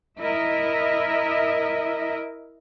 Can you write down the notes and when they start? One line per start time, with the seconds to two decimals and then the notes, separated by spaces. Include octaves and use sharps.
0.19 E4 A#4 D#5 E5